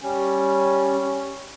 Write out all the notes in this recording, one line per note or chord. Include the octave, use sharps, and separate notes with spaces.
G3 C#4